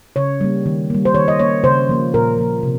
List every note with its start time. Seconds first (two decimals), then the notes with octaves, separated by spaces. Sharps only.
0.16 C#3 C#5
0.41 G3 A#3
0.66 D#3
0.90 G3 A#3
1.05 C5
1.15 D#3 C#5
1.28 D#5
1.39 A#3 C#5
1.64 C#3 C5
1.89 F3 A#3
2.14 A#2 A#4
2.38 F3 A#3
2.63 C3